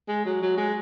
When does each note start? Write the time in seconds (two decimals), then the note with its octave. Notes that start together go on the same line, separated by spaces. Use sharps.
0.08 G#3
0.25 F#3
0.42 F#3
0.57 G#3